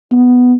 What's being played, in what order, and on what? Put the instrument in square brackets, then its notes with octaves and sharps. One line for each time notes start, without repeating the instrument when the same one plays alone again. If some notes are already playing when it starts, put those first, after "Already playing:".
[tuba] B3